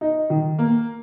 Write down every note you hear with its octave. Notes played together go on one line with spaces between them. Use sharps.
D#4
D#3
A#3